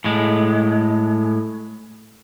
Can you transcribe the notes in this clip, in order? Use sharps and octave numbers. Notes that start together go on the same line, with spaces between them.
A2 G#3